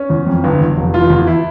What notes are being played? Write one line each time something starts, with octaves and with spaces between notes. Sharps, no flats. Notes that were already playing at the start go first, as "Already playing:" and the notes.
Already playing: C#4
E2
F2
G1
E2
F1
E3 F4
E2
E4